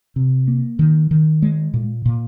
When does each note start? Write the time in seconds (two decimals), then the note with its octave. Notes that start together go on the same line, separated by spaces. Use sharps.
0.16 C3
0.48 A#3
0.79 D#3
1.11 D#3
1.42 G#3
1.74 A#2
2.06 A#2